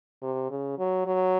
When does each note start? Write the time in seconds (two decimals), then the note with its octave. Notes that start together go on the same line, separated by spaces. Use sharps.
0.22 C3
0.50 C#3
0.78 F#3
1.06 F#3